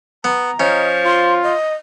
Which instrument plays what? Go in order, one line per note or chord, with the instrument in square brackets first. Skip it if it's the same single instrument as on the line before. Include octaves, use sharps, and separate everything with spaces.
[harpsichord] B3 [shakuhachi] A#5
[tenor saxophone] F3 [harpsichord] C#4 [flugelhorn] D#5
[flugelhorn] F4 [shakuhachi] C6
[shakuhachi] D#5